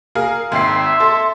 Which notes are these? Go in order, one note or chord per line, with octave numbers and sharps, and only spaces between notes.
G#4 A#4 F5
G#1 E5 G5 C6 C7
A4